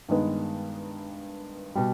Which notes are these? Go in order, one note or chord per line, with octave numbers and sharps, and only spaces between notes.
G2 D#3 G#3 B3
B2 G3